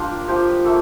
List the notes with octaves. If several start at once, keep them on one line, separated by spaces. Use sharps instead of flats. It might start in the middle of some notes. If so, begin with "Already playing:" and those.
Already playing: A#3 D4 F4 G4
F3 G4
A3 A#3 A4